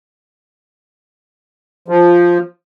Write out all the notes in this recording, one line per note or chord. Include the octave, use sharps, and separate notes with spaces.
F3